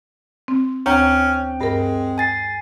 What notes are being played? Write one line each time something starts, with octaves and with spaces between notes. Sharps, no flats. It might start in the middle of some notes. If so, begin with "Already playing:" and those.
C4
D2 C4 C#4 G5 A#5 G6
G2 G#3 A#4
G#5 A6 C7